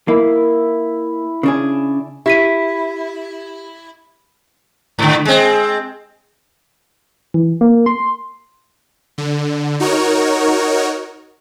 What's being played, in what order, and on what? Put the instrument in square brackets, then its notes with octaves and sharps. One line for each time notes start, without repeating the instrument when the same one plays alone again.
[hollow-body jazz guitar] A#3 [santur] E4
[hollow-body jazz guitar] C#3 D4 G#4
[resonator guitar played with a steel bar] E4 [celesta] G4 B6 D#7
[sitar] G#2 D3
G#3 C4
[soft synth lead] E3
A#3
C6
[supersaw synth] D3
D#4 F#4 A#4 C#5